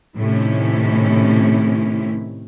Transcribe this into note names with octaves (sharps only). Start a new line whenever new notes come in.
A2 C3 D#3 C#4 E4